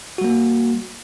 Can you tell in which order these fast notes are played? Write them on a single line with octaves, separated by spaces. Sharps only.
F#4 G3 A#3